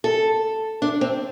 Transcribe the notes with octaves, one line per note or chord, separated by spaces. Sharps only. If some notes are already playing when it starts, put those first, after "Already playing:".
A4
D4
C4